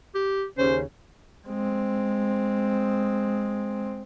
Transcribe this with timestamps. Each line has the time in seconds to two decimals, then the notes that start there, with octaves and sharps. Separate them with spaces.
0.15 G4
0.58 D#2 C#3 C#4 C5
1.47 G#3 C4